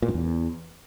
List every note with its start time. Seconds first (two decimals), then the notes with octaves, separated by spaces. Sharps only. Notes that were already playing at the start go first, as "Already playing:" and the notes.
0.02 A#2
0.08 G2
0.14 E2